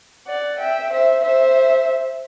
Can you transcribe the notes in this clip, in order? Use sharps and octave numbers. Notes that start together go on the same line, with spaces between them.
D5 F#5
E5 G5
C5 E5
C5 E5